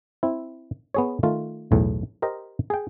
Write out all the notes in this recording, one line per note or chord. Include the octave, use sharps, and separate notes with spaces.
C4 E4
B3 G#4 C#5
D#3 A3 F4
B1 E2 A2
G4 A#4 C5 D#5
G#4 G5